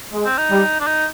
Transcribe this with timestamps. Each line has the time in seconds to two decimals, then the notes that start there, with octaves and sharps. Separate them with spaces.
0.14 G#3
0.25 C4
0.38 D#4
0.51 G3
0.80 D4
0.87 D#4